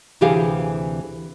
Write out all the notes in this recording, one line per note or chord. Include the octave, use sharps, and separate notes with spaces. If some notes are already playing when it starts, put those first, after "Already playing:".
D2 C3 E3 G4 G#4 F5